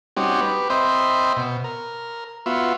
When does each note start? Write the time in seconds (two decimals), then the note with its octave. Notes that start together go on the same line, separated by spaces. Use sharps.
0.17 G3 C4 C#4 D#4 F#4 G4
0.41 G4 B4
0.70 C4 C5 D#5 E5 G5 B5
1.37 B2
1.64 A#4
2.46 B3 F4 F#4 E5